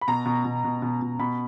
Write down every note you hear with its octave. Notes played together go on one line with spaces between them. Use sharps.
B5
B2 A#5
B2
B2
B2
B2
B2
B2 B5